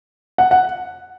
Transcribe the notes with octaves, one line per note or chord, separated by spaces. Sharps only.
F#5
F#5